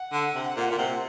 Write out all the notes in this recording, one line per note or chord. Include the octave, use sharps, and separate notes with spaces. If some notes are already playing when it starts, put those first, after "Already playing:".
Already playing: F#5
D3
C3
A#2
A#2
C3